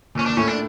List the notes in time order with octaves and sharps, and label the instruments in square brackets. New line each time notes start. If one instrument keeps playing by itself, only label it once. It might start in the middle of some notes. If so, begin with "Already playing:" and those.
[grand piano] A#2 [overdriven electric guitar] C#4
[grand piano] A#2 [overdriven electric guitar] D4
[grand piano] A2 [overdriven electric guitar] C#4
[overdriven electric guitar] D4